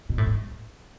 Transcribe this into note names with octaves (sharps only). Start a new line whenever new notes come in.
B2
A2
G#2